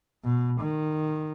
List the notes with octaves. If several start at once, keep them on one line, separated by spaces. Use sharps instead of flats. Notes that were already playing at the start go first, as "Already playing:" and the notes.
B2
D#3